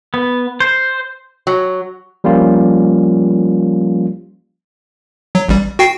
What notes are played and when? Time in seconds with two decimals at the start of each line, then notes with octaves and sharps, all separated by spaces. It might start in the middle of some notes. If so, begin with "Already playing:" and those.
0.14 B3
0.60 C5
1.47 F#3
2.24 F3 G3 A#3 C#4 F4
5.35 F#3
5.49 A1 G3
5.79 F#4 G5 C7